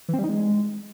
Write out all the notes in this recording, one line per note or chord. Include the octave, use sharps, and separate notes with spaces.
E3
C4
G3
D#4
G#3